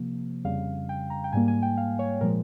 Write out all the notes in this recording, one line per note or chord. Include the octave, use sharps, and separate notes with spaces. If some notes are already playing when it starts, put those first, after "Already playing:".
Already playing: C3 F3 A#3
F2 C#3 G3 F5
G5
A#5
G5
G#2 G3 A#3 G#5
G#5
G5
F5
C#5
A#2 F3 G#3 A#4